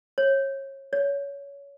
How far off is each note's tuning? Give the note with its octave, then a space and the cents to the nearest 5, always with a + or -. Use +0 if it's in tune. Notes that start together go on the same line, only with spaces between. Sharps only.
C#5 -25
C#5 +20